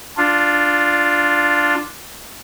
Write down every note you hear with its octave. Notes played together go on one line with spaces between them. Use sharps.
D4 F4